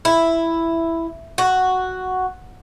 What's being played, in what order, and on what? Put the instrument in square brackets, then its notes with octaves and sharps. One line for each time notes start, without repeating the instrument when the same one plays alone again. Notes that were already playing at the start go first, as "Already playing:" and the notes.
[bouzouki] E4
F#4